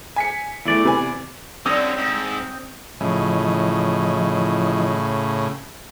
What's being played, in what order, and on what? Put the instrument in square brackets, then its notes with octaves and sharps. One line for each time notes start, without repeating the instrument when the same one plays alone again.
[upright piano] G#5 B6 C#7
[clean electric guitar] E2 D5 [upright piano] E3 A3 E4
[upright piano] C3 B4 G#5
[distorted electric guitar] D3 C#4 [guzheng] G3 E4 [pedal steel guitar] C4 [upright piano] D#6 E6 A#6
[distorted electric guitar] G#2
[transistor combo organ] A2 C#3 [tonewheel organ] E3 F3 D#5